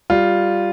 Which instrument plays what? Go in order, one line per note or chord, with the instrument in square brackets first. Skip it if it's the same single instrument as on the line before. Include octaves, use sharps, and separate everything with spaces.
[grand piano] G3 F4